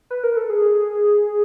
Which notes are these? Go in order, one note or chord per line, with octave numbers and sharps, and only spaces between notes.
B4
A#4
A4
G#4